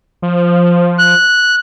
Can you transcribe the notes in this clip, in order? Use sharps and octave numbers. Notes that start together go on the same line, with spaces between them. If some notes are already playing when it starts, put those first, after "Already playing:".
F3
F#6